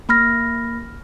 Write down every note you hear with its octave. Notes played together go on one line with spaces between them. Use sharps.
A#3 B5 F6 A#6